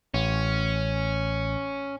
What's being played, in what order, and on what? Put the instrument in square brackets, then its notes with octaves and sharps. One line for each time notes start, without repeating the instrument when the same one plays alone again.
[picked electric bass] A1 [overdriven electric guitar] C#4